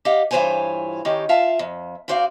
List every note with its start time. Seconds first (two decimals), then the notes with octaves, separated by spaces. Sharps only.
0.05 G4 D#5 F5 F#5
0.31 G2 E3 F4 C5 C#5 G#5
1.05 D#3 C#4 D#4 G4
1.29 F4 E5 F5 A5
1.59 F2
2.08 C#3 F#4 C5 D5 E5 F5